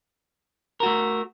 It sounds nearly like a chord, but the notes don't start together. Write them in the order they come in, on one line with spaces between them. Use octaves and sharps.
A#4 F#4 A3